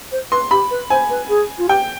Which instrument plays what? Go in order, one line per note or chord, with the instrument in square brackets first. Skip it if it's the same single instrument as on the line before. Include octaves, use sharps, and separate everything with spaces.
[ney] C5
[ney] B4 [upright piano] C6
[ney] G4 [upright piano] B5
[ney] B4
[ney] C5 [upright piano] G#5
[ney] B4
G#4
F4
[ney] G4 [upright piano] G5